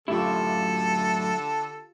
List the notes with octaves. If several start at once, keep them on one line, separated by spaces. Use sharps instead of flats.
F#2 A2 D3 E4 F4 G4 A4